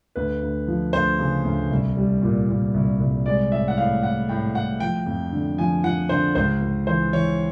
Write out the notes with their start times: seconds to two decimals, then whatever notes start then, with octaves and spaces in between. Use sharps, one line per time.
0.15 D2 B4
0.42 D2
0.68 F3
0.93 D2 C5
1.19 C#3
1.44 D2
1.71 C2
1.97 G3
2.22 A#2
2.49 A#2
2.74 C2
3.00 C2
3.26 G#3 D5
3.52 A2 E5
3.68 F#5
3.77 A2 F5
4.03 A2 F#5
4.29 A2 G5
4.55 A2 F#5
4.80 F3 G5
5.06 F2
5.32 D3
5.58 F3 G#5
5.84 F3 F#5
6.09 D3 C5
6.35 C#2 C5
6.62 C#2
6.87 E3 C5
7.13 E3 C#5